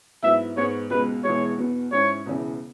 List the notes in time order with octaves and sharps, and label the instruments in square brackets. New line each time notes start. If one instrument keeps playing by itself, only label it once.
[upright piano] G#2 F#3 B3 E4 [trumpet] E5
[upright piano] G#2 G#3 B3 [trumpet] C#5
[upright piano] C#2 B2 G#3 [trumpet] B4
[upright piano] E1 E2 E3 G#3 [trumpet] C#5
[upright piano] E2 B2 B3
[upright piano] G#2 G#3 C#4 E4 [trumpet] C#5
[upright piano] E1 E2 C#3 E3 C#4